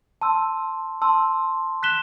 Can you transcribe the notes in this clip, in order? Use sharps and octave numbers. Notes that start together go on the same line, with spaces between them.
A5 C6 E6
A5 C6 E6
F#6 B6 E7 G7